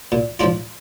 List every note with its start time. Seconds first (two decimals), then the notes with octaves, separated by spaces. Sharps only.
0.12 A#2
0.39 F3 G#3 D4 F4